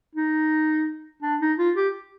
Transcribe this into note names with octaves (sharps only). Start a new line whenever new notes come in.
D#4
D4
D#4
F4
G4